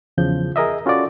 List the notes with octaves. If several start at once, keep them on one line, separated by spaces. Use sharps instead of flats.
E2 C#3 F3 G6
G#4 A#4 D#5 E5
C#4 F4 F#4 A4 D5